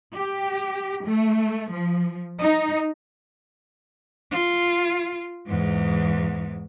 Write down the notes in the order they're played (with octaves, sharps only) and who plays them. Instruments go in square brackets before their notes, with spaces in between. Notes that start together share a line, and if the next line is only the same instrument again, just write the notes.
[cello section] G4
A3
F3
D#4
[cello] F4
E2 G#2